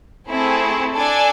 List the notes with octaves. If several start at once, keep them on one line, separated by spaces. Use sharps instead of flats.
A3 C4 E4 G#4
D4 A4 D5 G#5